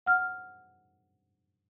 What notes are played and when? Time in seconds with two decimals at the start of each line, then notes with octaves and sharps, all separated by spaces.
0.06 F#5 F6